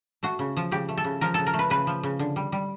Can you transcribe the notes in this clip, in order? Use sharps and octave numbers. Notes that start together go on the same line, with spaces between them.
A3 F#4
C#3
F3
C#3 G4
A3
A4
C#3
F3 A#4
C#3 A4
A#4
A3
B4
C#3 B4
F3
C#3
D3
G3
G3